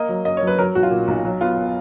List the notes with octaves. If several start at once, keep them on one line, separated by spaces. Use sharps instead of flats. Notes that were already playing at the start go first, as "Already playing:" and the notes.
Already playing: A#3 D#5
F#3
F#2 D#5
C#5
F#3
B4
F#3 A#4
B1 F#4
F4
A#2
B1
F#3
B3 F4
B3